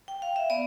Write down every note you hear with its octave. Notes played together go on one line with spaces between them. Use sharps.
G5
F5
E5
B3 D5